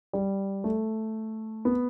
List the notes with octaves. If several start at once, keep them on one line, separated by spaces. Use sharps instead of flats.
G3
A3
B3